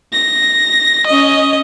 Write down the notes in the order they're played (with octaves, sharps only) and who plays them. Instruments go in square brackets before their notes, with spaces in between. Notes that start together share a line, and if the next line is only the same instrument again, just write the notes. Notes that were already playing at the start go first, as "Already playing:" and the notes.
[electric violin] A#6
C#4 D#5